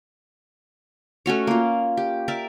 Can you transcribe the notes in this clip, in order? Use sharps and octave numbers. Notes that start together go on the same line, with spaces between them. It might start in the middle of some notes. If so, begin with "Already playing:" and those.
A3 C#4 F#4 C#5
A#3 F4
G4
A#4 D5 E5